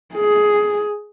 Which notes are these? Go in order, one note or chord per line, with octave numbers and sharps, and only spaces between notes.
G#4